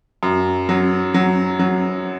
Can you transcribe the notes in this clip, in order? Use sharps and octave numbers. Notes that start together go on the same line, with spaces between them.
F#2
F#3
F#3
F#3